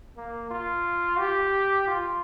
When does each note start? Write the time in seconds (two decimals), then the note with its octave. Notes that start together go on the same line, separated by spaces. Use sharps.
0.17 A#3
0.50 F4
1.19 G4
1.87 F4